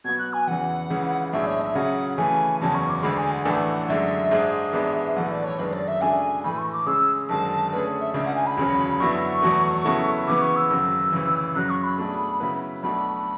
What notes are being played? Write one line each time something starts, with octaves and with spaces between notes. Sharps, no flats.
B2 F#3 B3 F#4 G#6
F#6
G#5
E2 C#3 E3 F#5
C#2 C#3 E3 G#3
B1 A2 G#3 D4 G#4 E5
C#5
E5
C#3 F#3 C#4 G#4 F#5
C#3 E3 A3 G#5
F#1 E2 C#3 F#3 A5
C#6
D6
D2 D3 G#3 B5
G#5
F#5
A1 A2 E3 A3 D4 F#5 G#5
F#2 D3 G#3 E5
G#2 G#3 D4 G#4 E5
A1 G#2 G#3 B3 D4
B1 A2 E3 A3 F#5
D5
C#5
G#1 F#2 D3 G#3 D4 B4
D5
E5
C#3 G#3 D4 F#4 A4 G#5
A2 E3 A3 B5
C#6
D6
C#3 G#3 C#4 G#4 E6
G#1 F#2 D3 G#3 A5
D3 A3 C#4 G#4 B4
E5
C#2 C#3 G#3 D4 E5
F#5
G#5
B5
E1 D2 C#3 F#3 C#4
F#2 D3 F#3 B3 E4 C#6
E2 B2 F#3 A3
C#3 F#3 B3 E4 A4
C#3 E3 B3 D6
C#6
E6
G#1 F#2 C#3
D2 C#3 E3
F#2 C#3 F#3 C#4 F#6
C#6
B5
B2 A3 D4 G#4
C#3 F#3 B3 E4 B4
B1 B2 A3 D4 A4 B5